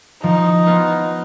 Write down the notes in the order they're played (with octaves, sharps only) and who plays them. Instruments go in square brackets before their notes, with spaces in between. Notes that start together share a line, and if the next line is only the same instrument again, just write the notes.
[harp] F3 [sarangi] D#4
[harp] B3 F4